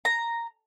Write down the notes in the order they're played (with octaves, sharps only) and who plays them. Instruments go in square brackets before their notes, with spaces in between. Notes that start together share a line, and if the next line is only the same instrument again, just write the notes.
[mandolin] A#5